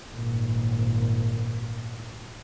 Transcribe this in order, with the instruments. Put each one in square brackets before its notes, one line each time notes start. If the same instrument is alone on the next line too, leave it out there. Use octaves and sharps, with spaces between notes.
[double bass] G#1 A#2